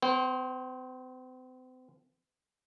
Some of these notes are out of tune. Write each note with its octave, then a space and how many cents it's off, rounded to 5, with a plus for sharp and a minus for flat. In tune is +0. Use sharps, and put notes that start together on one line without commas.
C4 -40 C5 +20